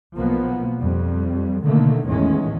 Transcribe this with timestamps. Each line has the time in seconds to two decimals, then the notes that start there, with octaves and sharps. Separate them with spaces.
0.16 B1 B2 F3 A#3 B3
0.78 F2 G3
1.64 B2 D3 D#3 A3 A#3
2.06 A1 E2 A2 D#3 G#3 C#4